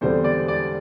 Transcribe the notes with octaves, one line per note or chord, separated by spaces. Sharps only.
E2 D3 G3 C4 C5
D5
D5